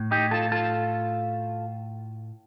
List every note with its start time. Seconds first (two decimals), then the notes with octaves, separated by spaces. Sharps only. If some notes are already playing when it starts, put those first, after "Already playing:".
Already playing: A2
0.11 D#4 G4
0.31 F4 A4
0.52 F4 A4